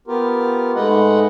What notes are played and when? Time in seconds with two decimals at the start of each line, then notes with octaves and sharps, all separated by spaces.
0.08 B3 F4 G4 A#4
0.76 G#2 G#3 A3 B4 D#5 F#5